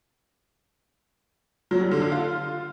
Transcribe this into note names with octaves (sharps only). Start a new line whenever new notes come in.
F#3
G3
D3
D3
F4